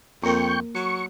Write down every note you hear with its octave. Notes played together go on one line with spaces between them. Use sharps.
F2 A#3 A#4 G5 C#6
F#3 C#6